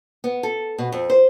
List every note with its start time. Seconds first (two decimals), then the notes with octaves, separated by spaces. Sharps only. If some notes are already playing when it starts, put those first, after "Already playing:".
0.24 B3
0.43 A4
0.78 B2
0.92 F2
1.10 C5